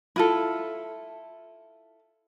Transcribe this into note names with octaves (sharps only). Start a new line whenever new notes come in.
E4 F4 A4